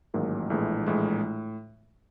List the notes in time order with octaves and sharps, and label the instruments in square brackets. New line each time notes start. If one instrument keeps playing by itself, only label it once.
[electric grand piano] A1 G#2 D#3 F#3 A#3
A#1 A2 E3 G#3
A#1 A2 E3 G#3
A2